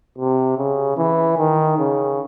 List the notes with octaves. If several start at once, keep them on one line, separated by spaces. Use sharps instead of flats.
C3
C#3
E3
D#3
C#3